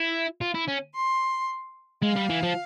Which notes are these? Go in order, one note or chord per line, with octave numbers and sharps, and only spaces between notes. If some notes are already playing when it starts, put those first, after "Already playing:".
Already playing: E4
F4
E4
C#4
C6
G#3 F5
G3
E3
F3